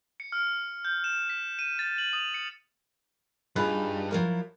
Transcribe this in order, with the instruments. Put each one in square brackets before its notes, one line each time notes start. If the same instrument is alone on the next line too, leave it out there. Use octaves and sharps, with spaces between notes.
[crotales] C#7
F6
G6
E7
B6
D#7
A6
F#7
D#6
C#7
[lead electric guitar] G2 [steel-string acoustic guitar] D#4 F4 [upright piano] G#4 B5 F#6
[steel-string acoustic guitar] F3 F#3 E4 [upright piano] A#4